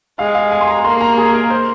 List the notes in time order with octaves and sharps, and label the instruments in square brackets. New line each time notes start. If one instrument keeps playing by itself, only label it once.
[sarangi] G#3 [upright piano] F5
[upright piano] F5
G#5
C6
A#5
[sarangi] A#3 [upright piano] C6
[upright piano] A#5
G#4
A#4
C5